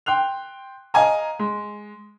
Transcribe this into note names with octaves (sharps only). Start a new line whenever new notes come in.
G5 C6 F#6 F7
D#5 F5 G#5 A#5
G#3